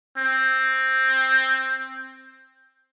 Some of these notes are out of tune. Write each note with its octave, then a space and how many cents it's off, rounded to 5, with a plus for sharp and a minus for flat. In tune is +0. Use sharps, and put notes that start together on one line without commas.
C4 +10